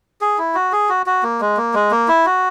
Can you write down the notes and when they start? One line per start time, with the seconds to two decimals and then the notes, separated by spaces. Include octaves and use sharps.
0.21 G#4
0.38 E4
0.55 F#4
0.72 G#4
0.89 F#4
1.06 F#4
1.23 A#3
1.41 G#3
1.57 A#3
1.74 G#3
1.91 A#3
2.08 E4
2.26 F#4